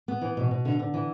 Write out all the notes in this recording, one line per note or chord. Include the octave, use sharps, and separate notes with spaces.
B3
E3
B2
B2
D3
D3
E3